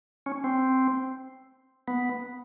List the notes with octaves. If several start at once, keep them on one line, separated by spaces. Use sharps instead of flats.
C#4
C4
B3